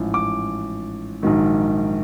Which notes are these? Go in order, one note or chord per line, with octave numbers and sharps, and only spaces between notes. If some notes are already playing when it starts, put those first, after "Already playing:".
Already playing: A1 G#2 F3
D6
A#1 G#2 D#3 F#3